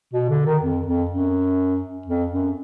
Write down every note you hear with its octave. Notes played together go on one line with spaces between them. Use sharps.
B2
D3
D#3
F2
F2
F#2
F2
F#2